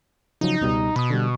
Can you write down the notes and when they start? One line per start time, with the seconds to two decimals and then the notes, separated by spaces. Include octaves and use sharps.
0.41 C#3 F3 F#3 D#4
0.61 C#2 B2 G3
0.96 B2 B5 D#6
1.10 D3 G3